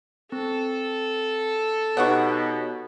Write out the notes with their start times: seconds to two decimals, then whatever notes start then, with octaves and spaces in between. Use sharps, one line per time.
0.32 C4 A4
1.97 B2 B3 D#4 G4 C#5 F#5 C#6